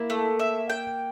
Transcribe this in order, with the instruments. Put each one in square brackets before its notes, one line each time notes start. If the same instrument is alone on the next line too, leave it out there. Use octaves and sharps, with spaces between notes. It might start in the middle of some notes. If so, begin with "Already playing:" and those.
Already playing: [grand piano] A#3 [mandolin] E4
[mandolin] A3
E5
G5